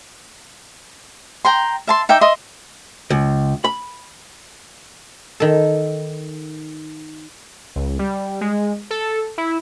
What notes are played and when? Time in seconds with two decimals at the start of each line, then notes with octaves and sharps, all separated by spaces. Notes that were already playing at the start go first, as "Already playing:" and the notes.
1.45 G5 A#5 C6
1.87 E5 A5 C6
2.09 D#4 E5 G5 D6
2.21 D#5 E5 C6 D#6
3.10 C#2
3.64 B5
5.40 D#3 A4
7.76 C#2
7.99 G3
8.41 G#3
8.90 A4
9.38 E4